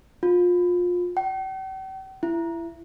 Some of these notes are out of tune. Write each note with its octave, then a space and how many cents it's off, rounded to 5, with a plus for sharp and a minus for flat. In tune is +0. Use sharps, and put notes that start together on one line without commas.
F4 +25
G5 -45
E4 +25